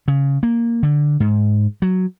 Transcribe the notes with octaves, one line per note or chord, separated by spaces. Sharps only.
C#3
A#3
D3
G#2
F#3